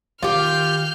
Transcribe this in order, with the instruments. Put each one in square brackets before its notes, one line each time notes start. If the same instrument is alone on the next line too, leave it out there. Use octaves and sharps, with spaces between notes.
[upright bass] D#3 [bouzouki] F4 G4 [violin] F6 G6